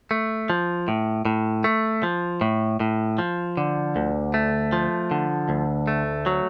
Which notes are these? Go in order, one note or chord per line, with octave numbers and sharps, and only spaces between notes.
A3
F3
A2
A2
A3
F3
A2
A2
F3
D3
D2
A3
F3
D3
D2
A3
F#3